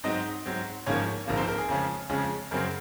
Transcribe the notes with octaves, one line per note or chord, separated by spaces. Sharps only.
G#2 F#3 C4 D#4 D#5
G#2 F#3 C4
G#1 G#2 F3 A#3 C#4 C#5
G#1 G#2 F3 A#3
C4 C5
A#4
G#4
F2 C#3 F3 G#3 C#4
F2 C#3 F3 G#3 C#4
F#2 C#3 F#3 C4 A#4